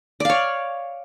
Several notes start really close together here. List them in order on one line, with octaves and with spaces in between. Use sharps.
D5 F5 C#5